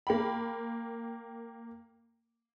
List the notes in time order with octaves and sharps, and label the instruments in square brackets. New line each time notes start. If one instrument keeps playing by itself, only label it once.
[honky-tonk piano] A#3 G5 B5